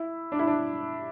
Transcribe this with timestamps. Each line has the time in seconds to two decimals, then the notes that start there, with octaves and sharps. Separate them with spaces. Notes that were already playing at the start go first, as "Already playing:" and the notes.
Already playing: E4
0.32 D4
0.39 E4
0.47 D4